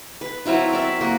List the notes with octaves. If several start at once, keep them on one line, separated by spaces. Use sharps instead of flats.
B4
F#3 C4 E4 F4
A#4 D5 E5
A#3 F#4 C6